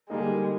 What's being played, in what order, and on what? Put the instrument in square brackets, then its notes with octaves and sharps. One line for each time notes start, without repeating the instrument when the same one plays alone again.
[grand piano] D3 G3 A#3 D#4 A#4 [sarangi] G#3